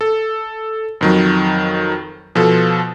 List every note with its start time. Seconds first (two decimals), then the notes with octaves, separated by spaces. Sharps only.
0.01 A4
1.01 F2 D#3 F#3
2.35 B2 F3 A4